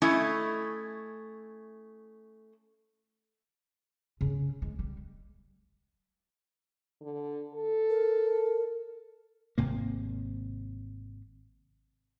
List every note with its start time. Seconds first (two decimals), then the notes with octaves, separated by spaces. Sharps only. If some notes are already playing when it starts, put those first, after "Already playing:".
0.02 A3 C#4 E4 D#5
4.21 C#3
4.62 G#3
4.79 G3
7.01 D3
7.54 A4
7.90 A#4
9.58 G#1 C3 A#3